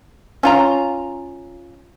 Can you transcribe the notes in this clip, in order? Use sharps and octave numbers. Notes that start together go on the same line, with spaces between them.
C#4 F4 A#5